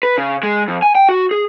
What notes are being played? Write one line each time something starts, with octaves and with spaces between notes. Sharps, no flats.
B4
C#3
G#3
F2
G#5
G5
F#4
G#4